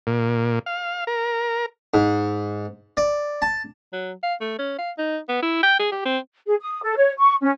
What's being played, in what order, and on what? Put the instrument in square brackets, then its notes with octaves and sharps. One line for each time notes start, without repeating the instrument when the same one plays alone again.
[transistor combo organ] A#2
F5
A#4
[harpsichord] G#2
D5
A5
[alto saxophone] F#3
F5
A3
C#4
F5
D#4
B3
E4
G5
G#4
G4
C4
[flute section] G#4
D#6
A4
C#5
C#6
C#4